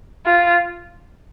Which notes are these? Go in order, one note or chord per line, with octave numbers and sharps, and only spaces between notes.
F4